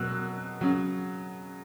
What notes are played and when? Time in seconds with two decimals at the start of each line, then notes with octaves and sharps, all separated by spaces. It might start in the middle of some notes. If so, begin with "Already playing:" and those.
Already playing: B2 F#3 E6 F#6
0.61 C#3 F#3